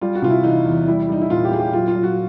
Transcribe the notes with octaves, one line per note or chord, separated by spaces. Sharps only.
G3 F4
F#4
C3 F4
E4
E3 D#4
E2
G3 E4
G3 D#4
E4
A#2 F4
G4
A#2 G#4
G4
F#3 F4
F4
F#3
F#4